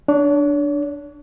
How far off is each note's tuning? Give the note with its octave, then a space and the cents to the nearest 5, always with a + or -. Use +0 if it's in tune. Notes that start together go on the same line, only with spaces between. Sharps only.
D4 +0 C#5 +40